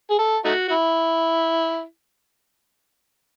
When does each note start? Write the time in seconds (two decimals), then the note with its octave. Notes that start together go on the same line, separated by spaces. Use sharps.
0.10 G#4
0.19 A4
0.45 A3 D#4 F#4
0.68 F#4
0.71 E4